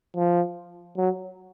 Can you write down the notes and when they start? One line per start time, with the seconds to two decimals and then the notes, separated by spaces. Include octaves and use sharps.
0.16 F3
0.97 F#3